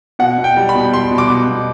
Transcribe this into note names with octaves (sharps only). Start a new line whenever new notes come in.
B2 F#5
B2
G5
G3
B5
B2
G3 C6
B2
D6
B2
B2